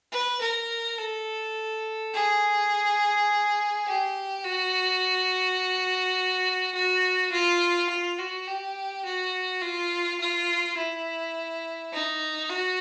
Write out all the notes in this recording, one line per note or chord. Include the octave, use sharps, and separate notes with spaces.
B4
A#4
A4
G#4
G4
F#4
F#4
F4
F4
F#4
G4
F#4
F4
F4
E4
D#4
F#4